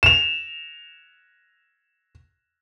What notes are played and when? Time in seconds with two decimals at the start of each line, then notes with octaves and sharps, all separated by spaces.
0.03 E7 F7